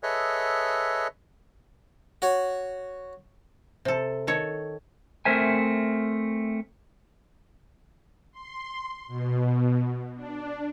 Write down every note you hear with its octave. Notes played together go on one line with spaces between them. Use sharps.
G#4 A4 B4 C#5 D#5 E5
F#4 C#5
C3 A4
D#3 A4 C#5
A3 C4 A#4 C5 E5 G#5
C6
B2
D4